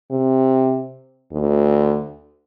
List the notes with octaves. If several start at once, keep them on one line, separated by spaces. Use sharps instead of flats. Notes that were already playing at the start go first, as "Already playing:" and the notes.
C3
D2